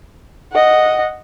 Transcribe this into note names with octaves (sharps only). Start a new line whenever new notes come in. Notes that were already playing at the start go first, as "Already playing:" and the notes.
D#5 F#5